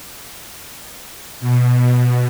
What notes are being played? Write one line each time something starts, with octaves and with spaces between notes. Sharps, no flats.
B2